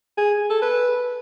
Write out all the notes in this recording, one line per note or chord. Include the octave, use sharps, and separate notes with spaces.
G#4
A4
B4